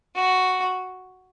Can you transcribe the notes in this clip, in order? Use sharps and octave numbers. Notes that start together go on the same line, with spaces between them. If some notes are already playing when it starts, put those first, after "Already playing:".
F#4